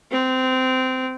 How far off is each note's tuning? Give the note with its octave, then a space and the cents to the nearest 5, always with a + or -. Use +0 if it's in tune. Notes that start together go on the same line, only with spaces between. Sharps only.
C4 -20